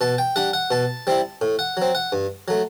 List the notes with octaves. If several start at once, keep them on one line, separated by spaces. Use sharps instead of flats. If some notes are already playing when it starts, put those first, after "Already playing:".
B2 A5
G5
G3 D4 F#5
F#5
B2 A5
G3 C4 E4
A2
F#5
F#3 C4
F#5
G2
F#3 A3